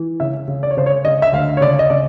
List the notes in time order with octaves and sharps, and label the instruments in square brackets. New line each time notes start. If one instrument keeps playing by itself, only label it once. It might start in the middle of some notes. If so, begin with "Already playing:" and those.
Already playing: [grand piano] E3
C#3 E5
C#3
D5
C#5
C#3 C5
C#5
C#3 D#5
E5
D2 F5
C#5
C#3 D5
D#5
C#3 D5